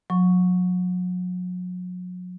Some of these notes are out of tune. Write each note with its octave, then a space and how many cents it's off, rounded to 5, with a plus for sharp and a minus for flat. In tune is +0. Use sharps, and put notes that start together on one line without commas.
F#3 -40 C#6 +0